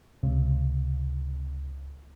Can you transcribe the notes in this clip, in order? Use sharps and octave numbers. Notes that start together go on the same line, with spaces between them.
C#2 C3